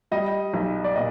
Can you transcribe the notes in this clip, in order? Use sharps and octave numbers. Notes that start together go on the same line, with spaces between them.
G3 D#5
B1
D5
A#2 D#5